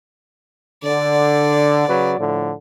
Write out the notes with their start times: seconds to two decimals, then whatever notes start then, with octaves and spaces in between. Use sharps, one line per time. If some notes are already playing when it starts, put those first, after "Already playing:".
0.84 D3 D5
1.88 C#3 F#3 B4
2.18 A2 D3 F3